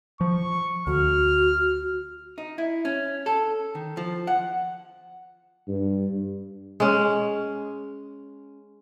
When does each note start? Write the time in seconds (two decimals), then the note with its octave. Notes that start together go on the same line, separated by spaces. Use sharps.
0.21 F3 C#6
0.87 D2 F#4 F6
2.38 D#4
2.58 E4
2.85 C#4
3.26 A4
3.75 D#3
3.97 F3
4.27 F#5
5.68 G2
6.80 G#3 C#4